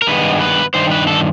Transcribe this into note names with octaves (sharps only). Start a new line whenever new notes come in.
A#4
G2 D#3 G#3 B3 B4
B4
G2 D#3 C5
B4
A4